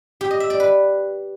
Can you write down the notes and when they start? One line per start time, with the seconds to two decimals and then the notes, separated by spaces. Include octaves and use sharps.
0.21 G4
0.31 D#5
0.40 E5
0.50 D5
0.60 B4